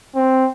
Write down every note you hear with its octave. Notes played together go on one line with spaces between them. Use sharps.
C4